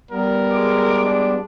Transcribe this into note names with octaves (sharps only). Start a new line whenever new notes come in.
G3 B3 A#4
G#3 D6
D4